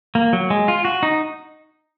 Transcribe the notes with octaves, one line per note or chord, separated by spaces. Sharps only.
A#3
F#3
G#3
F4
F#4
D#4